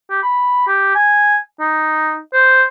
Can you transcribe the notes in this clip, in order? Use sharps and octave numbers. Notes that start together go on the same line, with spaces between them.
G4
B5
G4
G#5
D#4
C5